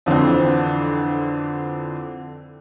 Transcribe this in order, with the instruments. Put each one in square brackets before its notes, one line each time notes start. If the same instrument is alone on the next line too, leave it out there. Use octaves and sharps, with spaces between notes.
[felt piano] F2 D3 E3 C4